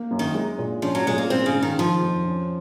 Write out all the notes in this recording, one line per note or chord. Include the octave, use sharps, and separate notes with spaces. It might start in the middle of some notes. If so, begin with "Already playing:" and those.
Already playing: A#3
F#2
D#3
G#3
A#2
F3 C#4
F#3
A#2 G#3
A#3
G#3 C4
C#3
G#2
D#3
D#3 F3
F2
C#4